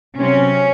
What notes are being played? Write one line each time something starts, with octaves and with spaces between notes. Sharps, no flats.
C3 F#3 C4 C#4